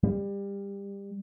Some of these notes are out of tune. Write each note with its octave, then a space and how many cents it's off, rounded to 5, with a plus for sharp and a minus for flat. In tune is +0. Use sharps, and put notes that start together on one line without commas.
G3 +25